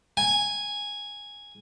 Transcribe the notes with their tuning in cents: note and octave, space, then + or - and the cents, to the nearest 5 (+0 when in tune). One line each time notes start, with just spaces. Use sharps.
G#5 -5